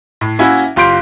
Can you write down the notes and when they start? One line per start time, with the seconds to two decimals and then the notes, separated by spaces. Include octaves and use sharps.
0.21 A2
0.39 A#3 C#4 E4 F#4
0.76 F#1 F4 G4 C6 G6 D7